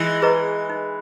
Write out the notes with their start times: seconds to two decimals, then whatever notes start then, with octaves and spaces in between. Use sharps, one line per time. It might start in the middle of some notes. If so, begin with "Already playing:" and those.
Already playing: E3 G#3
0.22 G#4 B4 D#5 A#5
0.70 D#4